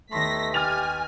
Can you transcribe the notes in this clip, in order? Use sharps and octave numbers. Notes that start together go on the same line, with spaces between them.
D#2 A3 B3 C6 A#6 B6
G4 G#5 F6 A6 F7